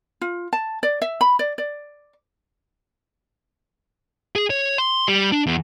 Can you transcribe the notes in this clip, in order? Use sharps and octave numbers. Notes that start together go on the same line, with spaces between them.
F4
A5
D5
E5
B5
D5
D5
G#4
C#5
C6
G3
D4
E2